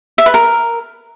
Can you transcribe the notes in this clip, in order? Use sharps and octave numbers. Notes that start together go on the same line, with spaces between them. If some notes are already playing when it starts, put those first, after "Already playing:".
E5
B4
A#4